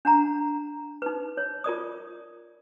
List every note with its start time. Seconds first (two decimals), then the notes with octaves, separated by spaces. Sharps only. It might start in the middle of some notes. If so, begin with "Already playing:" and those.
0.05 D4 F#5 A#5
1.02 D#4 B4
1.37 C#5
1.64 F4 A#4 D5 D#6